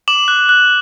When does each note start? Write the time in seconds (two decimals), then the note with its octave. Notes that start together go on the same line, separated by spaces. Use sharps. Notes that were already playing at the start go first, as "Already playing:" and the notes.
0.08 D6 E7 F#7
0.28 F#6
0.49 F#6